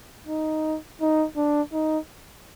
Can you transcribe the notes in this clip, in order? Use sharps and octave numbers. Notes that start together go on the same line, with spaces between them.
D#4
D#4
D4
D#4